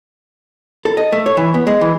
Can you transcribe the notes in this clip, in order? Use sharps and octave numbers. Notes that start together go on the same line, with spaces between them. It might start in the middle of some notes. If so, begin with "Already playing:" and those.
A4
D#5
A3
C#5
E3
B3
G#3
E3